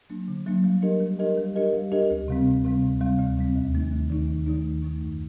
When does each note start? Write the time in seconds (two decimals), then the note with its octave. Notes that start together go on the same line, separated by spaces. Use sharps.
0.10 F#3 A#3 D4
0.28 D3
0.46 F#3 A#3 D4
0.64 G3
0.82 D4 G4 A#4 D#5
1.00 G3
1.19 D4 G4 A#4 D#5
1.37 G3
1.56 D4 G4 A#4 D#5
1.73 G3
1.92 D4 G4 A#4 D#5
2.10 D2
2.28 C3 G3 C4
2.47 D2
2.65 C3 G3 C4
2.83 D2
3.01 C3 G3 C4
3.19 D2
3.37 C3 G3 C4
3.56 D#2
3.73 D#3 A3 D#4
3.92 D#2
4.10 D#3 A3 D#4
4.28 D#2
4.47 D#3 A3 D#4
4.65 D#2
4.82 D#3 A3 D#4
5.01 F#2